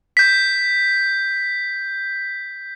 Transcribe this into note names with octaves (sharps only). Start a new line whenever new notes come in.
G6 B6